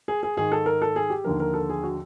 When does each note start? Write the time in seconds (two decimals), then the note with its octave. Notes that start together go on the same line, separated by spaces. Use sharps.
0.08 G#4
0.23 G#4
0.37 G#2 D#3 G#4
0.52 A4
0.66 A#4
0.82 A4
0.96 G#4
1.10 G4
1.24 D#2 D3 F3 A#4
1.40 A#4
1.54 A4
1.69 G#4
1.83 F#4